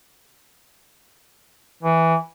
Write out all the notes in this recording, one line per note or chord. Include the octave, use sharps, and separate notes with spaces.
E3